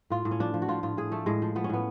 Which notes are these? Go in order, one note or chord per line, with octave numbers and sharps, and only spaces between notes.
A2 F4
A2
C#4
F3 D4
F3
F#4
F3 F4
A2 F4
A2 G#4
F3 A3
A2 G#3
F3
F3 B3
C#4
A2 B3